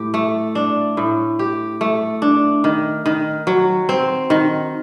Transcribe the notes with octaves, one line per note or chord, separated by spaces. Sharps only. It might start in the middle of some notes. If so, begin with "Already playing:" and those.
Already playing: A2 G4
A3
D4
A2
G4
A3
D4
D#3
D#3
F#3
C4
D#3